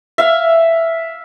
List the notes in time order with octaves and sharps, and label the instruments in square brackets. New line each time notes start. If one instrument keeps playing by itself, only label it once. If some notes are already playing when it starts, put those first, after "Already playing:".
[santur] E5 F5